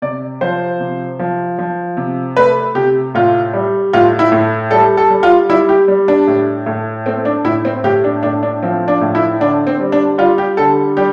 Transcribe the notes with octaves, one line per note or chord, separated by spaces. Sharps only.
C3 D5
F3 C5
C3
F3
F3
C3
A3 B4
C3 G4
A2 F4
G3
A2 F4
E4
A2
G3 A4
A4
G3
F4
G3 E4
G4
G3
D4
A2
A2
A3 C4
D4
A2 E4
C4
A2 G4
D4
A2 D4
D4
F3 C4
D4
A2
E4
D3 D4
C4
G3
D4
G3 F4
G4
D3 A4
G3 G4